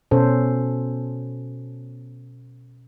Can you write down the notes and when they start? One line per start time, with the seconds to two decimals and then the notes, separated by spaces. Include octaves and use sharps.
0.11 B2 C#4 A4 C5